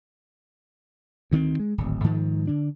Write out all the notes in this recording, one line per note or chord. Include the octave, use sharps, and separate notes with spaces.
D2 D#3 A#3 C4
G#3
D1 G#1
G#2 D#3 F3
D3 D4